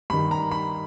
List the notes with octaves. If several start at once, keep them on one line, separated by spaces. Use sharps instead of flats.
G2 D#3 B5
A#5
B5